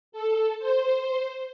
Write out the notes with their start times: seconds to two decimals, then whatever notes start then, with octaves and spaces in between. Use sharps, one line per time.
0.12 A4
0.59 C5